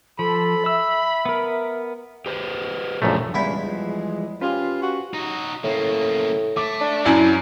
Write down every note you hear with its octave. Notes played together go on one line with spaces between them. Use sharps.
F3 A4 B5
E5 E6
B3 A#4
G4 B4 C5
A#1 F#2 A#2 C#3 A3
E2 C#3 G3 G#3 D4 E4 F4 E5
E3 F3
C#4 F4 G4 B4 C5 G#5
F#4
D#4 F#4
A2 C#3 A#3
A3 D6
D4
F#2 F#3 C#4 E4